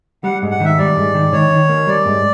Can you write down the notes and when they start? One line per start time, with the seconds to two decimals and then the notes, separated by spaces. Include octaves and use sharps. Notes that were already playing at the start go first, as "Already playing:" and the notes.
0.24 G3 F#5
0.42 G#2
0.51 F#5
0.60 D#3 E5
0.78 G3 D5
0.96 G#2
1.14 D#3
1.33 D#3 C#5
1.50 D#3
1.69 A#3
1.87 G3 D5
2.06 G#2